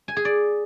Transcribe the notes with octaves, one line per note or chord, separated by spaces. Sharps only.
G#5
G#4
D5